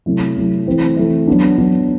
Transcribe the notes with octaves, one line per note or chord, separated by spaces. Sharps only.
C3 F#3 A3 E4
C3 F#3 A3 E4
E3 A3 C4 E4
E3 A3 C4 E4
F#3 B3 D4
F#3 B3 D4